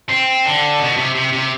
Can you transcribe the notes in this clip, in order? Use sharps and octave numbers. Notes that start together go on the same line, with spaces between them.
C4
D3
B2
C3
C3
C3